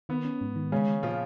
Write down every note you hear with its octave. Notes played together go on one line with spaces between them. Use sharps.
D#3 B3
C#4
G#2
D#3
C#3 G#3 C#4
D#3
A#2 F3 F4